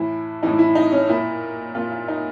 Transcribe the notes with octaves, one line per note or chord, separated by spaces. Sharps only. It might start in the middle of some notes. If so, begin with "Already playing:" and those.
Already playing: A2 E3 E4
A2 E3 D#4
E4
D#4
C#4
A#2 E4
A#2 F4
F4
D#4